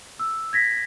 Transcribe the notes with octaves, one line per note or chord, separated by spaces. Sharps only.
E6
G#6 A#6 B6